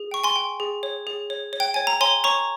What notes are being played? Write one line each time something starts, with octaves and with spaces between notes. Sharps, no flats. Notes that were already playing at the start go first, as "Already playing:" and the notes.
Already playing: G#4
G5 C#6
G#5 C6
G5
G#4
C#5
G#4
C#5
C#5
G5
C#5 G#5
A#5
C#5 G#5 C6
C#5 A#5 C#6